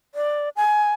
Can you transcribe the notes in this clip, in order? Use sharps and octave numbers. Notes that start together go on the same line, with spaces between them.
D5
G#5